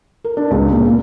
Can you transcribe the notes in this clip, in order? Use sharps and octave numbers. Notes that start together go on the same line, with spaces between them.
A#4
D4
C#2
A#2
A#2